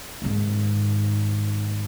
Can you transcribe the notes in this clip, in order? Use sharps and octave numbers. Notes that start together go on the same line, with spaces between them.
G#2 D#3